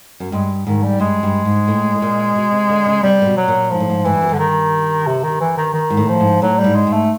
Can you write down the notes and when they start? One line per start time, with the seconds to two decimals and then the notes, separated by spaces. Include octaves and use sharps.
0.20 F#2
0.32 G2 G#3
0.66 G#2 D#3
0.82 G3
1.00 G2 G#3
1.23 G2
1.45 G#2
1.68 A2
1.96 A2
2.02 A#2
2.35 B2
2.52 C3
2.70 D3
2.86 C#3
3.03 C3 G3
3.22 A#2
3.26 B2
3.37 F#3
3.48 A#2
3.70 G#2 F3
3.80 A2
3.90 G#2
4.05 G#2 E3
4.13 G2
4.21 F#2
4.29 G2 D3
4.38 D#3
5.07 C3
5.23 D#3
5.40 E3
5.57 D#3
5.74 D#3
5.90 G#2
5.97 A2
6.08 F3
6.20 G#2
6.42 A2 F#3
6.59 G3
6.64 G#2
6.75 G#3
6.87 G#2
6.93 A3